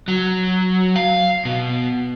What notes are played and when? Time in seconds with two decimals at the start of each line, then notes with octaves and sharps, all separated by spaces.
0.08 F#3
0.96 F5
1.45 B2